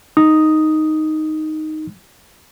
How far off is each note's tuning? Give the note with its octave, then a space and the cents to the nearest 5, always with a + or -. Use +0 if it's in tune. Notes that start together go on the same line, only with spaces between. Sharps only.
D#4 +0 D#6 +0